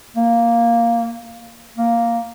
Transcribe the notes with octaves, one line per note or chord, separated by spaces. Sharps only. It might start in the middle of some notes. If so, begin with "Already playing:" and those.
A#3
A#3